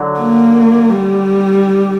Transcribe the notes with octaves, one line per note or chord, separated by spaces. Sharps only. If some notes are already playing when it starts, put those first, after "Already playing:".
Already playing: D3 F#3
A#3
G3